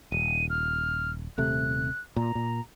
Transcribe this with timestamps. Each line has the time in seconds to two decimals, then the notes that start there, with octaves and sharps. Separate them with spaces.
0.12 D#1 D#7
0.50 F6
1.38 D#1 C3 A3 F#6
2.16 A#2 A#5
2.35 A#2